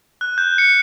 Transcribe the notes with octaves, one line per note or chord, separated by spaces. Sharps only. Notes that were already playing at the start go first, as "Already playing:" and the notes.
F#6
G6
C#7